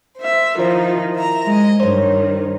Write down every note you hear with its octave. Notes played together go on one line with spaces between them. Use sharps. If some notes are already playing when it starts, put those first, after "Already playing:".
C5 E5
D#3 F3 D#4 E4 A#4 C5
E5 A#5
G#3 D#5
G2 D#3 C5 C#5